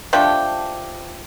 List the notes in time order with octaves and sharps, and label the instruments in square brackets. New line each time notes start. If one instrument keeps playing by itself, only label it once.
[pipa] F3 A3 D4 G4